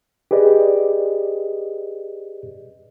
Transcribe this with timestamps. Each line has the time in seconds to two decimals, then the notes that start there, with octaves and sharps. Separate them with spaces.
0.31 G4 G#4 B4 D5 D#5